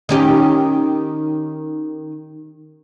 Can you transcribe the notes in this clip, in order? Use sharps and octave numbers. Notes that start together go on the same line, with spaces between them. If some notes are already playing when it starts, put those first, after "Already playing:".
D#3 C#4 G4